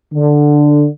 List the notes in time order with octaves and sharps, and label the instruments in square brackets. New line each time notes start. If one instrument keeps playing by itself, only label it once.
[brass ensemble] D3